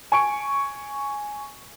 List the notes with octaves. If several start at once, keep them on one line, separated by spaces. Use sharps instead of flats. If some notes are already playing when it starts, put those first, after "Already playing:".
G#5 C#6 D7